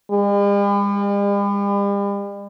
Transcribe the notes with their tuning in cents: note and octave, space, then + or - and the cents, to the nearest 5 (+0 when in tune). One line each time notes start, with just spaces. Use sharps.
G3 +45